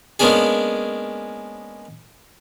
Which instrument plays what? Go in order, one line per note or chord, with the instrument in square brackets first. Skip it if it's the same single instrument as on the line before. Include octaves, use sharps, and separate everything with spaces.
[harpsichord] G#3 A#3 B3 C#4 D4 G#4